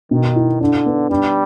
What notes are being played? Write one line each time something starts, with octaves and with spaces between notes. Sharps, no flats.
B2 D#3
E4
D3 D4
B3
G3 D4